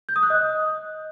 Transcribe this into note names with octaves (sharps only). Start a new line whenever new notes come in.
G6
D#6
F#6
D#5